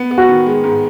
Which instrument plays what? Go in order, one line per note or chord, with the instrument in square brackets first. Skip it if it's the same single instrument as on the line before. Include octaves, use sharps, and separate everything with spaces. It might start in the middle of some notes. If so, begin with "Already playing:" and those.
Already playing: [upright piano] B3
B3
[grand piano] F#4
[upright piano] D#3
G#3
G#2